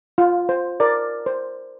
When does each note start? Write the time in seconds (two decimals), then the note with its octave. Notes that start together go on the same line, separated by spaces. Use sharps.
0.18 F4
0.49 C5
0.80 A#4 D5
1.26 C5